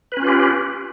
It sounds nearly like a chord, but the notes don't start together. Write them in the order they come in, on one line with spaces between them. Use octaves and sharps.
B4 C#4 F4 G4